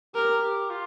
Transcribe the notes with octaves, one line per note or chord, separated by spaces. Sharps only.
G4 A#4
G4
F4